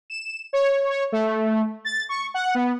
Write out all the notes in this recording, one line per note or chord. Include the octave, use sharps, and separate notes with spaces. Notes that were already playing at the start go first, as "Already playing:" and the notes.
E7
C#5
C#5
A3
A6
C#6
F#5
B3